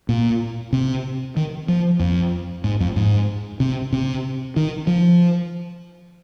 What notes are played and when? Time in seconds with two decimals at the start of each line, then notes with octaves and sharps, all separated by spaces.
0.09 A#2
0.73 C3
1.36 D#3
1.68 F3
2.00 F2
2.64 G#2
2.80 F2
2.96 G#2
3.60 C3
3.92 C3
4.56 D#3
4.87 F3